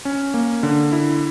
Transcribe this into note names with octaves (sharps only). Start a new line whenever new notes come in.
C#4
A#3
D3
E4